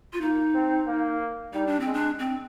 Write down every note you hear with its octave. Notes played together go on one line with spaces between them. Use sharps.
F4
A#3 D#4
C4
A#3
G3 D#4
D4
C4
G#3
D4
C4